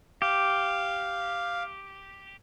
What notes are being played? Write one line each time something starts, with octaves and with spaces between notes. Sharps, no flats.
G4 F5